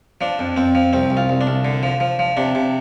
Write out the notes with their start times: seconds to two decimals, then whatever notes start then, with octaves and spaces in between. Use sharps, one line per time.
0.21 F3 D4
0.39 F2
0.56 F2 C4
0.75 F3
0.93 C2 C4
1.10 C2
1.17 F4
1.29 C2
1.41 D4
1.47 C2
1.65 D3
1.83 F3
2.00 F3
2.19 F3
2.37 C3 D4
2.55 C3